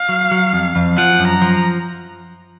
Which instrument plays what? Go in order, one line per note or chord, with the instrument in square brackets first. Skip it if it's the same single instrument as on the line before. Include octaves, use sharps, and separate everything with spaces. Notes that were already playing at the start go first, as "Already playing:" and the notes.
Already playing: [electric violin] F5
[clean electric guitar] F#3
F#3
F2
F2
[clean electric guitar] F3 [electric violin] F#5
[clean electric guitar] F#2
[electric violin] A#5
[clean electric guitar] F3